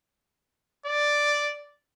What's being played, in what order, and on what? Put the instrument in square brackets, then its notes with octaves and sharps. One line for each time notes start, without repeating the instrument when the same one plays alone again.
[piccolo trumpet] D5